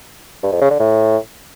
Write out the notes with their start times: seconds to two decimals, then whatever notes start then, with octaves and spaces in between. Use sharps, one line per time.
0.43 G2
0.52 F2
0.61 C#3
0.71 D3
0.80 A2